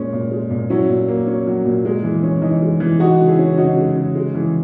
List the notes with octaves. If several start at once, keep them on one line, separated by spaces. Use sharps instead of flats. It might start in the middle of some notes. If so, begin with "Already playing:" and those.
Already playing: A#2 G#3 C#4
A#2
G#3
A#2
F#3 C#4 E4
A#2
A#3
C#4
F#3
A#2
G#3
E3
C#4
E3 D#4
G#3
E3
G#3 D#4 F#4
C#3
E4 G#4
C#4
C#3 D#4 F#4
G#3
C#3
G#3
E3